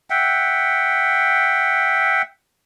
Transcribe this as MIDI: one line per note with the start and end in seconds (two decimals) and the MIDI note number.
0.10 2.22 76
0.10 2.22 78
0.10 2.22 79